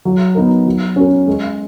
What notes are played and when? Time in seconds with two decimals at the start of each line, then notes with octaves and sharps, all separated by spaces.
0.05 F#3
0.35 B3 D#4 A#4
0.66 F#3
0.96 C#4 F#4 A#4
1.28 G#3